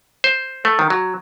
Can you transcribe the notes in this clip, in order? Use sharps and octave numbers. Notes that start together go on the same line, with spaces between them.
C5
A3
D#3
F#3